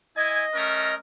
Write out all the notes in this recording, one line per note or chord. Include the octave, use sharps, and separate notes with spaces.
E4 D#5 G#5
A3 C#4 A#4